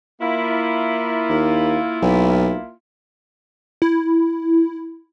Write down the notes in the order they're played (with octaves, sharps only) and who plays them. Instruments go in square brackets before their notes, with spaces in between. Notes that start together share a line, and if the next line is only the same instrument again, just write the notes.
[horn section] A#3 E4 F4
[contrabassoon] D#2
B1
[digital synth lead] E4